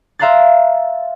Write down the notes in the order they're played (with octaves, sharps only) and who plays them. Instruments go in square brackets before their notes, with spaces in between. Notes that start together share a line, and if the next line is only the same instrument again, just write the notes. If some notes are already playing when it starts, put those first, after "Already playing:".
[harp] E5 F5 A#5 C6 F#6 A6